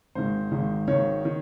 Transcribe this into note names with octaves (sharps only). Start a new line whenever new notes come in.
G#1 G#2 D#3 C5
G#1 G#2 D#3
G#1 G#2 D#3 C#5
D#3